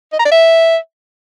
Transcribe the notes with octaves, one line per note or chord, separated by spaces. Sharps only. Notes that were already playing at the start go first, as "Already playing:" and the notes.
D#5
A#5
D5
E5